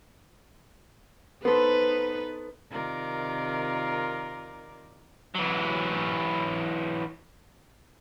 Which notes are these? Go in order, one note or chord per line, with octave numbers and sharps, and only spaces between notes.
B3 D#4 A4 B4 C5
C3 D#3 F4 A#4 D5
E3 F#3